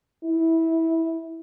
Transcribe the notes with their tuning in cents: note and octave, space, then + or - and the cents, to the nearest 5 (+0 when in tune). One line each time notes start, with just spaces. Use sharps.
E4 -15